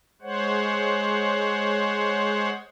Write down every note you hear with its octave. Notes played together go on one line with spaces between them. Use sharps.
G#3 C5 C#5 F#5